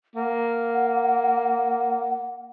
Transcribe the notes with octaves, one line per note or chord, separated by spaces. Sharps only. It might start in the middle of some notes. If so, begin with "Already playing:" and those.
A#3 F#5